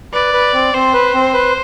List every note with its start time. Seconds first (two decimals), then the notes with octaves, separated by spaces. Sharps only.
0.13 B4 D5
0.33 B4
0.54 C4
0.74 C4 C5
0.94 B4
1.14 C4
1.34 B4